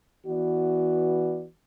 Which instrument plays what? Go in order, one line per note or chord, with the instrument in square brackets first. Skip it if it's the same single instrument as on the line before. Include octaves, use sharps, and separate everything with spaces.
[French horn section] E3 B3 F#4 D5